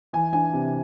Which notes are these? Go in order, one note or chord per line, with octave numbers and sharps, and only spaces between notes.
E3 G#5
D4 G#5
C3